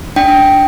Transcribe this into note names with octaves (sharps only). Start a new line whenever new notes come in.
D4 G5